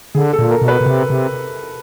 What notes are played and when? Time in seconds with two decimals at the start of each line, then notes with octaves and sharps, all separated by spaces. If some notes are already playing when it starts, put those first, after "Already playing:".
0.15 D3 G#4
0.33 A4
0.39 A#2
0.51 A#4
0.62 B2
0.68 B4
0.81 B2
0.86 C3
1.10 C3